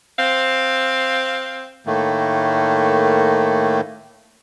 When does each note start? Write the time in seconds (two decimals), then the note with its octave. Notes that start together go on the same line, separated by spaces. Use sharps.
0.19 C4 F5
1.86 A2 D#3 A3 A#3